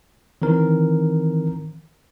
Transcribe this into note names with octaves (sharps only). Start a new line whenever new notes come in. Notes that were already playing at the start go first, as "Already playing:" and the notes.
D#3 E3 C4 A#4